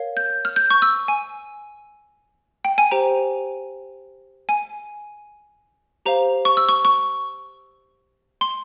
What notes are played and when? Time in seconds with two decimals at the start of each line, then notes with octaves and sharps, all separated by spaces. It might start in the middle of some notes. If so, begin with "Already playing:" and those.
Already playing: A#4 C#5 F5
0.17 G6
0.45 F6
0.56 G6
0.70 C#6
0.82 E6
1.08 G#5
2.65 G5
2.78 G#5
2.91 G4 C5 G5 A#5
4.49 G#5
6.06 G4 C5 F5 A#5
6.45 C#6
6.57 E6
6.69 C#6
6.85 C#6
8.41 C6